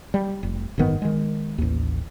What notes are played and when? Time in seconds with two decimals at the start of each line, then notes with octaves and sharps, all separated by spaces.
0.14 G3
0.43 F1
0.78 F#1 G#2 D#3 B3
1.02 D#3 G#3
1.58 A1 D#2